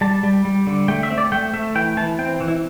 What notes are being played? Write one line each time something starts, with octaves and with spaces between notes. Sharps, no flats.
G3 A5
G3
G3
D3
A3 G5
E5
C4
D5
A3 G5
A3 E5
E3 G5
E3 A5
C4 G5
E3
E4